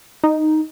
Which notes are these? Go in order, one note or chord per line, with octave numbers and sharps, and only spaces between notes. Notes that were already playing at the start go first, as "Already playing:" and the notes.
D#4